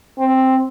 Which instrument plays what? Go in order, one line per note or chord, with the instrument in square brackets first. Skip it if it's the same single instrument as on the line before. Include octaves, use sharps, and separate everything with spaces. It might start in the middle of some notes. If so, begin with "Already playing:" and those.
[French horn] C4